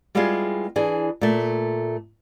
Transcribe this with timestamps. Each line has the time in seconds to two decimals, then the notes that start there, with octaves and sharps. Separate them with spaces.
0.15 G3 G#3 B3 E4 F4 G#4
0.76 E3 D4 G#4
1.21 A#2 A3